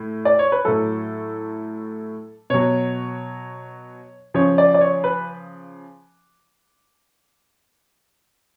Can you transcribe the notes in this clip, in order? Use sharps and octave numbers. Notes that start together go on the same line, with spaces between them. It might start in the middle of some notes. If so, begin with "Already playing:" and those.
Already playing: A2
D5
C#5
B4
A2 F#3 A4
B2 F#3 C#5
C#3 F3 C#5
D5
D5
C#5
B4